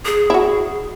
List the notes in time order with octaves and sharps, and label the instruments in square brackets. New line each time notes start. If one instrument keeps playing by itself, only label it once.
[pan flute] G#4
[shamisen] E4 F#4